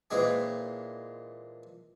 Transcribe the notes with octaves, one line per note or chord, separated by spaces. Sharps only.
A#2 E3 G#3 C4 D4 G#4